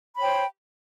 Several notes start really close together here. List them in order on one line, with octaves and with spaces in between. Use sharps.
B5 C#5 G5 C5